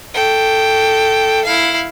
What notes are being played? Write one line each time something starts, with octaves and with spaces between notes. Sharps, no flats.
A4 G5
E4 F5